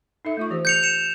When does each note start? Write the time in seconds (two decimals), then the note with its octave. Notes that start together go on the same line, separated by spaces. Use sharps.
0.25 D#4 A4 E5
0.37 A3 F4 C#6
0.51 E3 G4 C5
0.65 G6 C#7 F7
0.83 C#7 E7